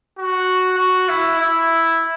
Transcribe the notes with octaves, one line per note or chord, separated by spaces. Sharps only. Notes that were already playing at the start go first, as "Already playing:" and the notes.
F#4
F#4
E4
E4